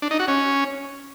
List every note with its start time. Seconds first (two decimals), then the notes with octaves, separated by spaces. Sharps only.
0.02 D4
0.11 D#4
0.19 F#4
0.28 C#4